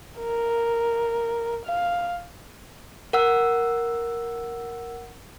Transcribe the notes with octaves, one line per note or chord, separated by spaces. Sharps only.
A#4
F5
A#4 F#5 E6